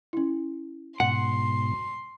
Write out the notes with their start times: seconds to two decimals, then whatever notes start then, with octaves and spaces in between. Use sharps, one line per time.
0.13 C#4 E4
1.00 G#2 B2 F#5 C6